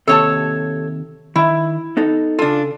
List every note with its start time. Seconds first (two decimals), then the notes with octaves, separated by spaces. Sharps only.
0.08 D#2 C3 A4 C#5 A5
1.36 D#3 E4 E5
1.97 B3 D#4 A4
2.39 C#3 D4 F4 A4